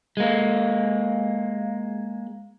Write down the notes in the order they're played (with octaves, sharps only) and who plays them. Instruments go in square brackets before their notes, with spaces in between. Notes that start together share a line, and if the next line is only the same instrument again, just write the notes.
[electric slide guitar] G#3 A#3